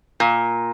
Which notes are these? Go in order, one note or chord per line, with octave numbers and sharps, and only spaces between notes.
A#2